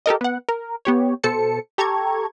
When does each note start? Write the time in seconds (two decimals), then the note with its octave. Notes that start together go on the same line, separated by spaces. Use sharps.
0.06 G4 A4 A#4 D#5
0.21 B3 F#5
0.49 A#4
0.85 B3 G4 C#5
1.23 B2 A4 C5 A5 C#7
1.78 G4 A4 A#5 C#6 G#6